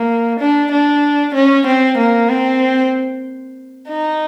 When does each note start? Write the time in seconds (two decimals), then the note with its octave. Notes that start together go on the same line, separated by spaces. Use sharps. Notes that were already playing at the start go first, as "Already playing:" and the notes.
Already playing: A#3
0.40 D4
0.71 D4
1.34 C#4
1.67 C4
1.97 A#3
2.29 C4
3.88 D#4